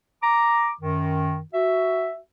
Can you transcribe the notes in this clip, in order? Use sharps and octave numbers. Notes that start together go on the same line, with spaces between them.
A#5 D6
F#2 D#3
F#4 E5